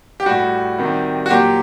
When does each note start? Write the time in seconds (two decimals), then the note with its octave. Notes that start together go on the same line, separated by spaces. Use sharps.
0.20 G4
0.26 A2 G3 F#4
0.79 C3 D#3 G3
1.26 F#4
1.30 A#2 F#3 G4